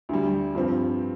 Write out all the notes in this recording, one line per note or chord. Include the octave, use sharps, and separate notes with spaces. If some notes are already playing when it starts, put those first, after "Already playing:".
D2 D3 G3
G2 F3 C4